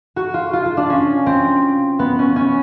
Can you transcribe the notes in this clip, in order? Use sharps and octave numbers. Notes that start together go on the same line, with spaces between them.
F#4
F4
F4
F4
D4
C#4
C4
B3
C#4
C#4